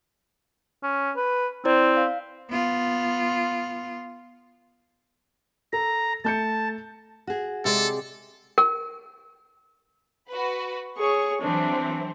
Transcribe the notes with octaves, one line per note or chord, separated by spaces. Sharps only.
C#4
B4
C4 E4 C5 D5
F5
B3 F4
A4 A#5
A3 A5 G6 C#7
F#4 G#4
C3 G#3 A4 D5
A#4
F#4 B4
G#4 C#5 C#6
E3 F#3 C4 D4